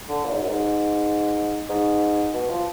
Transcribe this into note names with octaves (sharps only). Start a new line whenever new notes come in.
D3
A#2
G#2
F#2
G#2
G#2
B2
F3